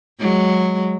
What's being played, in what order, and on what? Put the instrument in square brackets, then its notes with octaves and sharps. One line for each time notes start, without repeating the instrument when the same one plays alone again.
[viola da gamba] F#3 G#3